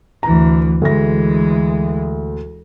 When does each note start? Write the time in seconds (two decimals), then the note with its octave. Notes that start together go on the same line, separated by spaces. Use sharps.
0.23 D2 E3 A#5
0.82 D2 E3 G#3 A#6